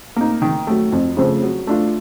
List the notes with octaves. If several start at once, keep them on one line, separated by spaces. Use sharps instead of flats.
A#3 D#4
D#3
F#3 A3
F2
C#3 F3 A3 C4
F#3
A3 D4 F4